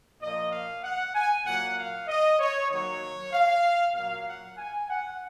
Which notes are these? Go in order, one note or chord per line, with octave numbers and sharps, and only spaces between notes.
A#2 F3 A#3 D#5
F5
F#5
G#5
A#2 F#3 A#3 F#5
F5
D#5
C#5
D#3 F#3 A#3 C#5
F5
A#2 F#3 A#3 F5
F#5
G#5
F#5